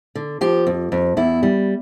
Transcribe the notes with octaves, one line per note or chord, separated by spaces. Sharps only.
D3
F3 G4
F2
F2
E2 E4
G3